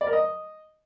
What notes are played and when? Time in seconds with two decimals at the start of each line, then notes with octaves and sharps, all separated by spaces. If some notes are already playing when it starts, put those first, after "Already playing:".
0.01 D5
0.07 A#4
0.13 D#5